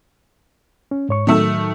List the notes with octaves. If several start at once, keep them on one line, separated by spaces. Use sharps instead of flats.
C#4
G#2 C#5 C#6
A2 D#3 F#3 A3 E6